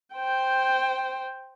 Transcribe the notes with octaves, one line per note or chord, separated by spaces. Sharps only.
C5 G5